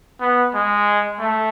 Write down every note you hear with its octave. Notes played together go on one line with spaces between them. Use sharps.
B3
G#3
A3